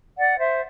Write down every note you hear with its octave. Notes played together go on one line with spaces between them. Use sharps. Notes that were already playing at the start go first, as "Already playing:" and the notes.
D5 F#5
C5 E5